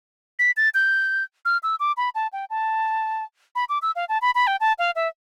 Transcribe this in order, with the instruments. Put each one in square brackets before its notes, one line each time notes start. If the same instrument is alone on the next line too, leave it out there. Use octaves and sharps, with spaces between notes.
[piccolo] B6
A6
G6
F6
E6
D6
B5
A5
G5
A5
B5
D6
E6
F5
A5
B5
B5
G5
A5
F5
E5